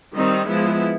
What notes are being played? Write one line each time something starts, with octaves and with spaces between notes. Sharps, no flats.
D#3 G3 C4 D#4
F3 G#3 B3 E4